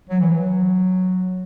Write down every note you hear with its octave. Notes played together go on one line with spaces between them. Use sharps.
F#3
E3
F#3